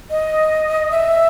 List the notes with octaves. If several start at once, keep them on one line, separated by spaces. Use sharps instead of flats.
D#5
E5